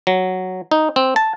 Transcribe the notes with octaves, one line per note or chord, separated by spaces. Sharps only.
F#3
D#4
C4
A5